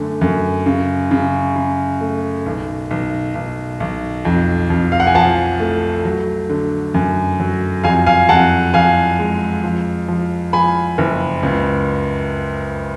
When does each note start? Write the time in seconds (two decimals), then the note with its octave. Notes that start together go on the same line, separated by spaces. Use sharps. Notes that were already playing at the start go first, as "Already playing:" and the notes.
Already playing: F#2 D3 A3
0.21 F#2
0.66 C#3
1.11 C#3
1.56 C#3
2.01 A3
2.46 B1
2.91 B1
3.35 B1
3.80 B1
4.25 F2
4.70 F2
4.92 F5
5.00 F#5
5.07 G#5
5.15 F3 F#5 A5
5.60 A3
6.05 F#3
6.49 D3
6.94 F#2
7.40 F#3
7.84 F2 F5 G#5
8.06 F5 G#5
8.29 F2 F#5 A5
8.73 F2 F5 G#5
9.19 G#3
9.64 F3
10.08 F3
10.53 F3 G#5 B5
10.98 F#1
11.43 C#2